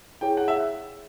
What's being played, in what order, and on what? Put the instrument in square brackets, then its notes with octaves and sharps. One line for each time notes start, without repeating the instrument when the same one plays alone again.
[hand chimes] E4 G#4 C#5 [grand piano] G5
[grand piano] F#5
E5